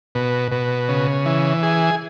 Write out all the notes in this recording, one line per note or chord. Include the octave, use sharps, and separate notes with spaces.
B2
B2
C#3
E3
G#4